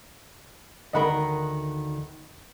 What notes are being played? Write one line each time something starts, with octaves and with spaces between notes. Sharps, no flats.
D2 D#3 A#4 D#5 F#5 B5